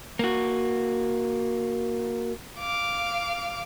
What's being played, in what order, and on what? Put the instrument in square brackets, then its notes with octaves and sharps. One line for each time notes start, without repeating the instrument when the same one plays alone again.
[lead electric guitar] A#3 F#4
[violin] F5 D6